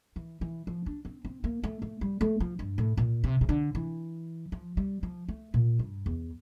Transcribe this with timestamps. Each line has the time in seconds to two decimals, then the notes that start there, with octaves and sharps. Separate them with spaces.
0.16 E3
0.41 E3
0.67 F3
0.86 D4
1.05 C4
1.25 C4
1.44 A#3
1.64 A3
1.82 A3
2.01 G3
2.21 A3
2.40 F3
2.59 G2
2.78 A2
2.97 A#2
3.24 C3
3.41 C3
3.49 D3
3.75 E3
4.52 F3
4.77 G3
5.03 F3
5.29 A3
5.54 A#2
5.79 G2
6.06 E2